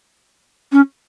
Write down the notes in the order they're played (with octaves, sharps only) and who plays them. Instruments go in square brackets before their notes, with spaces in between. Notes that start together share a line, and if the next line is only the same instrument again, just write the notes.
[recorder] C#4